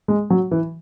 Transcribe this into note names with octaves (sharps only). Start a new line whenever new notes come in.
G#3
F#3
E3